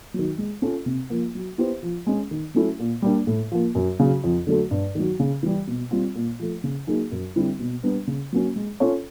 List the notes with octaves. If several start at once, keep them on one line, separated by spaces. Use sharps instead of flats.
D#3 F#3
G#3
C#4 F4 A4
C3
F3 A#3
F#3
B3 E4 G4 C5
F3
G#3 C#4
D#3
F#3 A3 C#4 E4
A#2
G3 A#3 D4
A2
F3 A#3
F#2
C#3 F#3
F2
D3 F#3 A3
G2
D#3 F#3
C#3
E3 G3
B2
G3 C4 F4
A#2
F3 A3
C#3
F#3 A#3 D#4 G#4
F#2
D3 G3 C4 E4
B2
G3 B3 D4
C#3
F#3 A#3 C#4
G#3
C#4 F4 A4 C#5